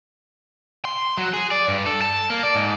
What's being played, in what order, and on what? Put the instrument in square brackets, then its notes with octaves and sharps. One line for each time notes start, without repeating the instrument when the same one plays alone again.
[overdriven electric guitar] C6
F#3
G#4
D5
G2
A4
A5
A#3
D5
G#2